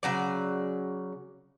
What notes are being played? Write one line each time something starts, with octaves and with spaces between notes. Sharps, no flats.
C#3 F#3 D5